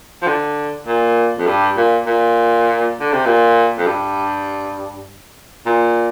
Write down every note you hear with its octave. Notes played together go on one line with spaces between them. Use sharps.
F3
D3
A#2
F2
G2
A#2
A#2
D3
C3
A#2
F2
G2
A#2